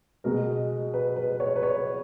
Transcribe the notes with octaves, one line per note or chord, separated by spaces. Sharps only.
B2 G#3 A#4
B4
B4
C#5
B4
C#5